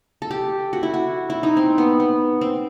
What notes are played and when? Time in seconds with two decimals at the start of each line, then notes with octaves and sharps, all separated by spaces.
0.22 A4
0.31 G4
0.73 F#4
0.83 E4
0.94 F#4
1.30 E4
1.43 D#4
1.57 C4
1.78 B3
2.00 B3
2.41 C4